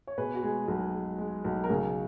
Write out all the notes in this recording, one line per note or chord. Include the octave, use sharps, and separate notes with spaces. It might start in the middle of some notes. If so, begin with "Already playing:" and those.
C#5
B2 G#4 B4
F#4
G#3 G#4
B1 G#4
G#3
G#3
B1
A#4
C#3 G#4